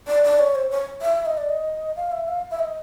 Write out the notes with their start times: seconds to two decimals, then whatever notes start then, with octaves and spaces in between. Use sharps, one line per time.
0.08 D5
0.24 D5
0.39 C#5
0.55 C5
0.71 C#5
1.02 E5
1.26 D#5
1.37 D5
1.49 D#5
1.97 F5
2.12 E5
2.28 F5
2.51 E5
2.59 D#5